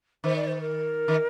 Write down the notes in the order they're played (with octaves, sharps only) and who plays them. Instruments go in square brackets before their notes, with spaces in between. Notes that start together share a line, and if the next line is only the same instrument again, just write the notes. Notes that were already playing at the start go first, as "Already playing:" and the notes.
[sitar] D#3 [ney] C5
[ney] D5
C5
A#4
[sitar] D#3